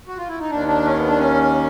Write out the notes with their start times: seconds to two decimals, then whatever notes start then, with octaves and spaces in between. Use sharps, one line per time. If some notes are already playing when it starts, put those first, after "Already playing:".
0.08 F#4
0.18 F4
0.29 E4
0.40 D#4
0.50 D#2 D#3 D4
0.68 D4
0.85 C#4
0.96 B3
1.08 D4
1.19 C#4